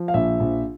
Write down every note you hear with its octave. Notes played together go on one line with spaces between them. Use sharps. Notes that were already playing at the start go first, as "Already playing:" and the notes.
Already playing: F3
F5
A#1 E5
A#1